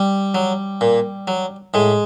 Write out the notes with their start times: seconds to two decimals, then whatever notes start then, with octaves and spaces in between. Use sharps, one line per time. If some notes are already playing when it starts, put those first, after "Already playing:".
Already playing: G3
0.35 F#3
0.81 A#2
1.28 F#3
1.74 A2 G#3